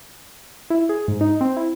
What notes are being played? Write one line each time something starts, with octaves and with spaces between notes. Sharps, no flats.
E4
G#4
G#2
D#4
C4
E4